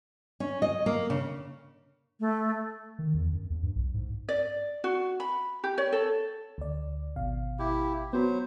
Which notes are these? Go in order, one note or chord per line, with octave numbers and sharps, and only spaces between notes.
C#4
D#5
A#3
C#3
A3
D#3
E2
F#2
D#2
G2
B1
G#2
D5
F#4
B5
G4
C#5
A4
D2 D5
G#1 B2 F5
E4 G4
F#3 B3 F#4 C5 B5